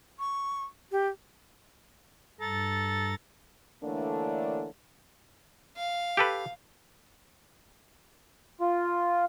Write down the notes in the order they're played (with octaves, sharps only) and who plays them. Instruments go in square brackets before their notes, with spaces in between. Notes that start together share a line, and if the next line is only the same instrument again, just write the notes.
[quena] C#6
G4
[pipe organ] G2 A#5 A6 [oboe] A4
[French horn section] D3 E3 A3 A#3 D4 C#5
[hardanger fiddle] F5
[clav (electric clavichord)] G4 A4 B4
[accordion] F4